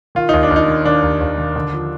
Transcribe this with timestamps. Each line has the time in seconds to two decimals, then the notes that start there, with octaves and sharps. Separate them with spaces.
0.15 D#3 F4
0.29 D#2 D#4
0.43 D4
0.51 D#2
0.56 D#4
0.68 D#3
0.85 D#3 D4
1.02 D#2
1.21 D#2
1.38 D#3
1.56 D3
1.73 F3